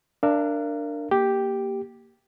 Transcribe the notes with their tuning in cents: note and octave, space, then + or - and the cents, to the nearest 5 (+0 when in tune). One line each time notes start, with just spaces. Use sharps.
D4 +5 A#4 -15 F5 -40
A#3 +0 G4 +0